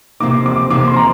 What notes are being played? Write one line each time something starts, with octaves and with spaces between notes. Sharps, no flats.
C3 F3 A#3 D#4 D6
D6
C3 F3 A#3 D#4 D6
C6
A#5